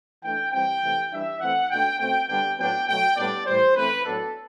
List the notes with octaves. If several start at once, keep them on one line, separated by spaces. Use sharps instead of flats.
E3 A3 D4 G5
E3 G3 C4 G5
C3 E3 A3
E3 G3 D4 E5
E3 A3 C4 F#5
B2 A3 D4 G5
B2 A3 C4 G5
D3 G3 B3 D4 G5
A2 F#3 B3 D4 G5
B2 F#3 A3 G5
A2 G3 B3 D4 D5
A2 E3 G3 C5
E3 A3 C4 B4
A2 F#3 B3 D4 A4